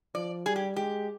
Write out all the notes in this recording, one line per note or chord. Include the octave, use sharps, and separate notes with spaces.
F3 D5
G3 G#4
G4
G#3 G4